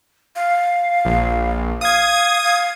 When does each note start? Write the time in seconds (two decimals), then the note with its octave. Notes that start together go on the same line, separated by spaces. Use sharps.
0.36 F5
1.05 A#1
1.81 F5 D#6 G#6
2.44 F5